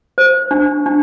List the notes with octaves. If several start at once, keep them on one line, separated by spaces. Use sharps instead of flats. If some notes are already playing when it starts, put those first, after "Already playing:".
C5
D4
D4